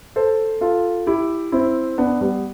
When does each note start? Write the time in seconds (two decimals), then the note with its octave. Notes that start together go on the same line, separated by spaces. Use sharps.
0.16 A4 C5
0.61 F4 A4
1.07 E4 G4
1.52 C4 E4
1.98 B3 D4
2.21 G3 B3